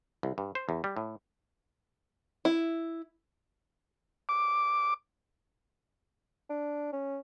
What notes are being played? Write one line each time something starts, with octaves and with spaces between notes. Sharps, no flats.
C2
G2
C5
E2
G3
A2
E4
D6
D4
C#4